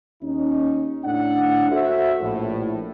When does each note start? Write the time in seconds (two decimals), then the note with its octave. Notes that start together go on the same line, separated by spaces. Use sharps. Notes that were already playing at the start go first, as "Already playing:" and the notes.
0.22 D#2 C#4 D#4
1.05 A2 D4 F#5
1.71 F#4 A4 C5 E5
2.21 A#1 A2